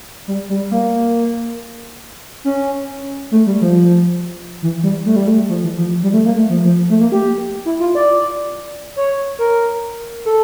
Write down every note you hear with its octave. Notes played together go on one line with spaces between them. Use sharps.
G3
G3
A#3
C#4
A3
G3
F3
E3
G3
A3
G3
A3
F3
E3
F3
G3
A3
A#3
A3
F3
F3
A3
A#3
G4
E4
F4
D5
C#5
A#4
A4